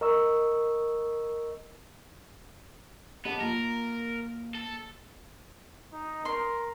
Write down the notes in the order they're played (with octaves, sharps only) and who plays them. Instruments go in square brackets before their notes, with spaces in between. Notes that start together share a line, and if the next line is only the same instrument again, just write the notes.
[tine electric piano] A#4 D#5 C#6 E6
[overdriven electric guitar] B3 [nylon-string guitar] G4 D#5 A5
[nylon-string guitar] A#3 F4 [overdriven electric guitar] A#4
[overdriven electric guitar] A4
[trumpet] D#4
[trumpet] A#4 [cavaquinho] C6